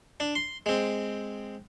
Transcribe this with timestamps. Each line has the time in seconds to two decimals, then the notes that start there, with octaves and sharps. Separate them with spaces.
0.20 D4
0.36 C6
0.66 G#3 C4